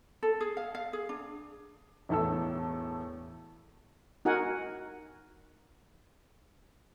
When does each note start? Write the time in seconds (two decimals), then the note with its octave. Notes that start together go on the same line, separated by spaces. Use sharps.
0.23 A4
0.41 G#4
0.57 F5
0.75 F5
0.93 G#4
1.09 D4
2.09 E1 E2 A2 A4 A5 E6
4.25 D#4 F#4 A#4 F#5 G#5